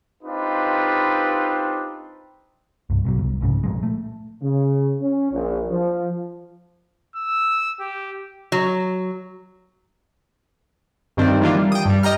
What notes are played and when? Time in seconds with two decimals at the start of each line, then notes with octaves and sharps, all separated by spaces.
0.23 C4 D4 D#4 F4 G4 B4
2.90 C2 G2
3.04 B1 B2 F#3
3.18 F1 C2
3.41 F1 C2 G#2 C#3
3.63 A#2 F3 G#3
3.83 A3
4.42 C#3
5.01 C#4
5.32 A#1
5.70 F3
7.16 E6
7.80 G4
8.52 F#3
11.17 G2 D#3 C4 D4
11.41 D#3 E3 A#3 D4 F4
11.56 G3
11.72 G5 D#6
11.86 G2 G3
12.03 D#5 G5 A#5 F6